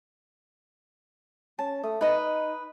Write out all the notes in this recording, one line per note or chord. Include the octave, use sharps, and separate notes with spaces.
C#4 A5
A3 D#6
D#4 B4 D#5